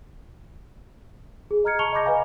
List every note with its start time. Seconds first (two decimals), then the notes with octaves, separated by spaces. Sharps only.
1.51 G#4
1.64 D#5 A#5 F6 G#6 C#7
1.79 A5 C#6 C#7 F7 G7
1.93 D#5 B5 C#6 D6 G6 A#6
2.05 B4 D#5 F5 G#5 A#5